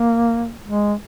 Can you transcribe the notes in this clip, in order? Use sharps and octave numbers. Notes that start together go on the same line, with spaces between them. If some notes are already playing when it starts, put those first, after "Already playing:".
Already playing: A#3
G#3